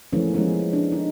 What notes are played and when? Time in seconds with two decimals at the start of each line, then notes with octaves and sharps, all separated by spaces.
0.13 E3 F3 A3 A#3 C#4
0.34 E3 G#3 B3 C#4
0.73 D4
0.92 D#4